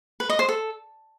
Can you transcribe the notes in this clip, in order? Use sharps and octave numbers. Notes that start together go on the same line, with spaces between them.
B4
D#5
C5
A4